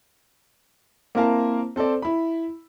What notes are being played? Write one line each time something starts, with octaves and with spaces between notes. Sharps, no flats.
A#3 C4 E4 A#4 F5 A5
C4 A4 C5 D5
E4 B5